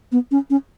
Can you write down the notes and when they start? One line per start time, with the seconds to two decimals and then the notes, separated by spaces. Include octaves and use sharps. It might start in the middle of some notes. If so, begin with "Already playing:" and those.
0.12 B3
0.31 C#4
0.50 C#4